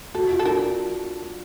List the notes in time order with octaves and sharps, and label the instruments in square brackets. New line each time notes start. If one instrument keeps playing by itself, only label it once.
[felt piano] F#4 [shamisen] A4
[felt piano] F4
[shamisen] A4
[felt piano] D4 [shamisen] A#4